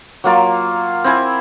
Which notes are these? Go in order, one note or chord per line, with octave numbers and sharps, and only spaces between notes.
F#3 A#3 F4
C4 E4 G#5